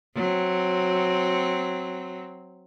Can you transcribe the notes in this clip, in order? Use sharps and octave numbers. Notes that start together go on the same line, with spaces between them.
F#3 C4